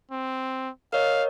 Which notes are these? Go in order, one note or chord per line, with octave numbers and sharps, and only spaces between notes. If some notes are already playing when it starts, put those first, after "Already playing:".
C4
A#4 C#5 D#5 F5